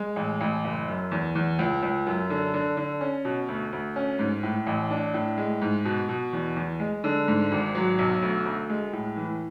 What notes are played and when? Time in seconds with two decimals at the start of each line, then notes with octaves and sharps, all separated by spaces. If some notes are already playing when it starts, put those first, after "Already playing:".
Already playing: G#3
0.16 A1
0.41 A1
0.65 F#1
0.88 F#2
1.11 E2
1.35 E2
1.59 C#2
1.83 C#2
2.07 F#2
2.30 D3
2.54 D3
2.77 D3
3.01 C#4
3.25 B2
3.49 D2
3.73 D2
3.96 C#4
4.19 G#2
4.43 A2
4.67 A1
4.91 D4
5.14 A2
5.38 G#3
5.62 G#2
5.85 B2
6.09 B2
6.33 E2
6.56 E2
6.80 G#3
7.04 D3
7.28 G#2
7.51 G#1
7.75 F#3
7.99 B1
8.22 D2
8.45 D2
8.70 G#3
8.93 A2
9.17 E3